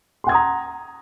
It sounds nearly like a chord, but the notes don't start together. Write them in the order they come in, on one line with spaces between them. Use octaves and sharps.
C6 F#5 G#6 D#6 A#5